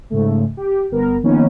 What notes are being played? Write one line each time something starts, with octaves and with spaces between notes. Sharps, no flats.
G#2 C#3 A3
G4
G1 B3 A#4
D#3 F3 A#3 B3 C#4 D#4